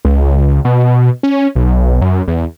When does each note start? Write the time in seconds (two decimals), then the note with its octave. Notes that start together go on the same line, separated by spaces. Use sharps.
0.05 C#2
0.65 B2
1.23 C#4
1.55 B1
2.01 F#2
2.28 E2